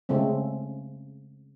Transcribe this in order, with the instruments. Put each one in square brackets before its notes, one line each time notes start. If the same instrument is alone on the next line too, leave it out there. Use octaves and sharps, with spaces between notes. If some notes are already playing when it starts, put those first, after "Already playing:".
[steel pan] C#3 G#3 A3 C4